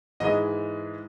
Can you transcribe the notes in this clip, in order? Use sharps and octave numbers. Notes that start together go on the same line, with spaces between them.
G#2 E3 G#3 D#5